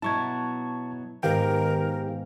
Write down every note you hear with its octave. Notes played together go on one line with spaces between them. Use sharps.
B2 F#3 E4 A5 C#6 G#6
G#2 D#3 B3 D#4 G4 A#4 F5 G5